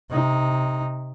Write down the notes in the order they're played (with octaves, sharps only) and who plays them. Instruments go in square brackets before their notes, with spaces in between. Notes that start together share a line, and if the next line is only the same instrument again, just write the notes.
[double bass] C3 D#4